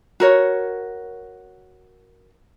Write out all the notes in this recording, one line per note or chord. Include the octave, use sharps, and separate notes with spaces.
F#4 A#4 C#5